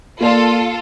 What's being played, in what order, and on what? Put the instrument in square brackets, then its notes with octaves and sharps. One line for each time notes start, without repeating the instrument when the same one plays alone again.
[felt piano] A#3 D5 [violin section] F4 A4